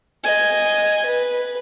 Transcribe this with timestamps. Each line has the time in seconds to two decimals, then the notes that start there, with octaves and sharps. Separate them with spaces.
0.24 D#5 G#5
1.06 B4